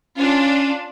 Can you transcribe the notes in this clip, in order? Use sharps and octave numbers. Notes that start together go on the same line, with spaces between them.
C#4 D4 F4